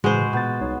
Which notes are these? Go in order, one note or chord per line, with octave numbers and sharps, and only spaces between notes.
A2 C#3 E3 G#3 F#4 B4 C5
A#2 B3 G6 A6
C2 D#4 C#5